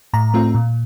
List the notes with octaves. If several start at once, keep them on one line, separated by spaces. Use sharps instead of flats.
A2 A#5
A3 C4 F4
A#2